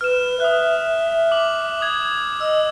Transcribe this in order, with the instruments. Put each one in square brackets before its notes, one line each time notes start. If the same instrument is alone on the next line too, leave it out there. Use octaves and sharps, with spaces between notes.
[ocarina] B4 [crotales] F6 E7
[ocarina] E5 [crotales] D#6 F#6
[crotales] D6 F#7
D#6 G#6
[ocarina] D#5 [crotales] E6